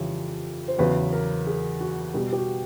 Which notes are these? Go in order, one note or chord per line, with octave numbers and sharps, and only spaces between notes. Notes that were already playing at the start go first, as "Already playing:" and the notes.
Already playing: F2 C#3 E3 G3
C5
E2 C#3 F#3 B4
A#4
G#4
F#4
B2 G3
G4
F#4